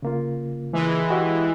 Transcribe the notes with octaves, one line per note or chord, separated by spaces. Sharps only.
C#3 A#3 F4
E3 G#3
F#4 G4 D#5